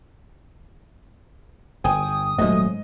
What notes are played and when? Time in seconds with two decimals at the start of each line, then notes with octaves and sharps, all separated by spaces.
1.84 G1 G5 G#5 D#6
2.38 D#1 G#2 F#3 A3 D#5